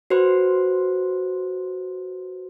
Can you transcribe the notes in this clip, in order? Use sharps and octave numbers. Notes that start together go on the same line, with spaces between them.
F#4 B4 C5 C6